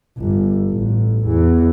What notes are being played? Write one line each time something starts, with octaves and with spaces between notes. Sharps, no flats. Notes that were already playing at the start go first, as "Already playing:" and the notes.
G1
A1
E2